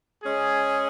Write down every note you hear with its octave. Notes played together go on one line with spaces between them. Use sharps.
G#3 C#4 G#4